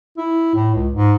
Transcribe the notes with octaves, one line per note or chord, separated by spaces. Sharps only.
E4
A2
C#2
G#2